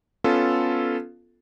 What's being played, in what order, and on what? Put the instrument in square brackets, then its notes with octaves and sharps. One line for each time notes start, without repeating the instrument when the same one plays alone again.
[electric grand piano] B3 C#4 F4 A4